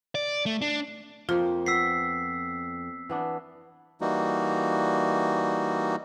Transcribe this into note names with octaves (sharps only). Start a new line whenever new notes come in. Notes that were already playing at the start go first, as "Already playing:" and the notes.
D5
A3
D4
F2 F3 A#3 F4
B3 E6 B6 C7
E3 B3 D4
E3 G3 A#3 D#4 F#4